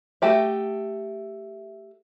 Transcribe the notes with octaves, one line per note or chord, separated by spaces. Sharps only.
A3 F#4 G4 E5